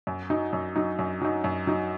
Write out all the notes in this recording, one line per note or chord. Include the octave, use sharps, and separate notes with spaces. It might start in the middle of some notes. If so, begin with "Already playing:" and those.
F#2
F#3 D#4
F#2
F#3 D#4
F#2
F#3 D#4
F#2
F#3 D#4